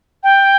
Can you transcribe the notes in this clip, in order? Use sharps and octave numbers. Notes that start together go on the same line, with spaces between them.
G5